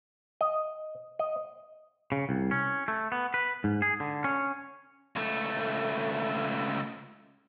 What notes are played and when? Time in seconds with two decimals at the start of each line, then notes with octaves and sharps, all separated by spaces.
0.41 D#5
1.19 D#5
2.12 C#3
2.29 C2
2.51 C#4
2.88 A3
3.12 B3
3.34 B4
3.64 G#2
3.82 G#4
4.00 D3
4.24 C#4
5.16 C#2 A3